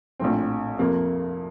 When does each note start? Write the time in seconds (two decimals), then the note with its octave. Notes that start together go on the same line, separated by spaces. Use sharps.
0.20 A#1 A2 F3 C4
0.79 F2 C3 F3 A#3